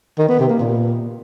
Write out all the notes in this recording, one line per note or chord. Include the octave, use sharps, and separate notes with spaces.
D#3
B3
C3
A#3
A#2